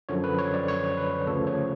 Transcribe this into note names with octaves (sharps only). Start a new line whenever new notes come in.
F#2 D3 F3 C#5
B4
C#5
D5
C#5
B4
D2 C#3 F3 A4
C#5